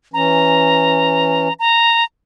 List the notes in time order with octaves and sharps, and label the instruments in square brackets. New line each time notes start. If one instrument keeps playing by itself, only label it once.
[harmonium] E3 C#4 [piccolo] A#5
[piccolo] A#5